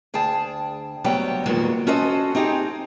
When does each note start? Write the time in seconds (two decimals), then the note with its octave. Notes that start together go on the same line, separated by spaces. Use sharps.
0.14 D2 G#4 G5 A5
1.04 D2 F#3 G3 B3 C#5 G5
1.46 E2 A#2 D#3 G#3 F#4
1.87 C#4 F#4 A4 C5 D#5
2.35 C4 D#4 G4 G#4